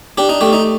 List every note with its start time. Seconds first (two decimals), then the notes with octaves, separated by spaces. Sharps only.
0.18 D4 G4
0.29 D#4
0.41 A3 G4
0.53 D#4